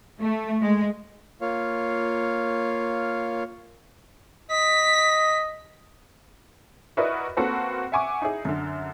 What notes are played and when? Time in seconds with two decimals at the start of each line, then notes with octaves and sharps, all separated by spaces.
0.20 A3
0.61 G#3
1.41 A#3 F4 C#5 F5
4.51 D#5 B6
6.97 E4 F#4 A#4 B4 D5 D#5
7.37 A#3 C4 F#4 A4 B4
7.92 E5 F#5 G#5 C#6 D6
8.22 D#4 E4 G#4
8.45 F#2 D3